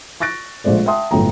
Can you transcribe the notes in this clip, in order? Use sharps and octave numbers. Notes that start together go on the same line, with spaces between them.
C#6 F#6 A6 A#6 D7
A#1 G#3 A3 C5 D5
E5 F#5 G5 A5 C6 D#6
G1 A2 F#3 A3 G5 A#5